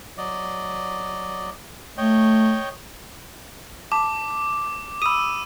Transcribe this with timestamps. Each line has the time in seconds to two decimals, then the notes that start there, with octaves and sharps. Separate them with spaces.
0.18 F#3 D5 D#5
1.98 A3 C#5 D#5 G5
3.92 A5 D6
5.02 B5 D#6 E6 D#7